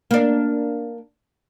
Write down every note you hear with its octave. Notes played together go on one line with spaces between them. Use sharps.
A#3 D4